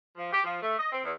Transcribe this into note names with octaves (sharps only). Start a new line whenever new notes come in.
F3
G4
F3
A3
D#5
C4
E2